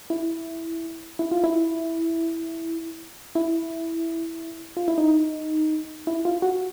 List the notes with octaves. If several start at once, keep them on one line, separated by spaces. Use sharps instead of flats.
E4
E4
F4
E4
E4
F4
E4
D#4
E4
F4
F#4